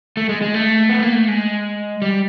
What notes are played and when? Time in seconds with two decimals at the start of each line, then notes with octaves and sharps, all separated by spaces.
0.17 A3
0.29 G#3
0.42 G#3
0.54 A3
0.89 B3
1.03 A#3
1.15 A3
1.28 G#3
2.02 G3